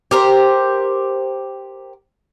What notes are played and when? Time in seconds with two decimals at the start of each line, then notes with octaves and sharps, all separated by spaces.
0.11 G4 A#4 C5